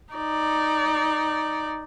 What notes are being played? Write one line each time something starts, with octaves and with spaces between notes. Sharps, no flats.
D#4 D5